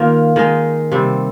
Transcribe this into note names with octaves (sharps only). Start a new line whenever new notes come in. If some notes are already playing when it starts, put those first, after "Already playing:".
Already playing: D#3 A#3 F4
D#3 G#3 D#4
C3 G3 C4